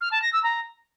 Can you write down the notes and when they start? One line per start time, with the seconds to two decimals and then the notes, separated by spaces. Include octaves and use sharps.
0.01 F6
0.11 A5
0.22 A#6
0.32 E6
0.43 A#5